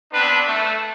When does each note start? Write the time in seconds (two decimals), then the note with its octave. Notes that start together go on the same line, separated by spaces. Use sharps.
0.13 B3 C4 D4 B4
0.48 A3